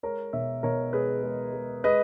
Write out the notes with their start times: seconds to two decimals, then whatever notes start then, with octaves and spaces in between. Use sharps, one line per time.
0.03 G#3 A#4 C#5
0.33 B2 C#5 E5
0.63 B2 A#4 C#5
0.93 G#3 G#4 B4
1.23 G#3
1.53 G#3
1.84 G#3 B4 D#5